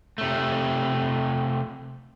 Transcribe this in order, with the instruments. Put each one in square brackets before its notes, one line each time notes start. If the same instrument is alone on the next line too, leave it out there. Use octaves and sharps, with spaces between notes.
[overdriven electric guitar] C3 A3